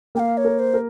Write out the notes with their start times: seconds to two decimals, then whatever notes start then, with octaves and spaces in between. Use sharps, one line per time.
0.15 A#3 G5
0.19 F5
0.37 C#5
0.45 A#4
0.59 C5
0.74 A#4